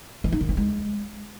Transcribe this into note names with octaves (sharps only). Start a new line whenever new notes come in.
E3
D#4
D#3
C4
G#3